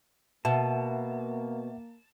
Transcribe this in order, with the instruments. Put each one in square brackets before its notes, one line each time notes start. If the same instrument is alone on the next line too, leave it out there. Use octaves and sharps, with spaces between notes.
[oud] B2 [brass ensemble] A#3 [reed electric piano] E5 F#5 [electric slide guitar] A5